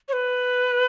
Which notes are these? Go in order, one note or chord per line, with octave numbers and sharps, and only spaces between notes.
C#5
B4